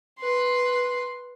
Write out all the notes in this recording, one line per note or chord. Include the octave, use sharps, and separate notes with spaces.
B4 C6